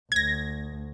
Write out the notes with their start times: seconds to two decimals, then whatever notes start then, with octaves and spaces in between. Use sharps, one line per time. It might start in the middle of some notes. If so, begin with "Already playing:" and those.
0.12 D2 G#6 A#6